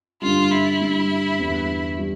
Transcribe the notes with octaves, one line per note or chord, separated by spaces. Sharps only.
G2 D3 G3 F4
E4
G2 D3 G3
E2 D3 G3
G3